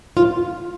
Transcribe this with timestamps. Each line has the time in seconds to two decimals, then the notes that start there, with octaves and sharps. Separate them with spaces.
0.17 F4